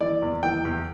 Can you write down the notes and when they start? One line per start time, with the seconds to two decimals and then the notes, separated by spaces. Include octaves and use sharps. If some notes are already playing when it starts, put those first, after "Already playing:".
0.01 E3 D5
0.22 E2
0.43 E3 G5
0.65 E2